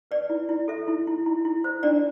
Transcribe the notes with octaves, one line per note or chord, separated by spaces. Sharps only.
B4 D5
E4
E4
A4 E5
E4
E4
E4
E4
C5
D4 D5